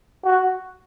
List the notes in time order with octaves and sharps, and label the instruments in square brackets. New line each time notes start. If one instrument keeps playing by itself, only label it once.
[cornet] F#4